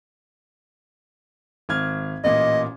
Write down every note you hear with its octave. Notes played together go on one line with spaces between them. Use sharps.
G#1 F6 G#6
A1 A#2 D#5